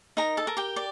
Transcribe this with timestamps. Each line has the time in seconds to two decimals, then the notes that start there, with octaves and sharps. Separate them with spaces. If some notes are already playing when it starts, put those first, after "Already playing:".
0.17 D#4 A#4 A#5
0.37 A4 A5
0.47 A#4
0.57 G4 G5
0.76 D5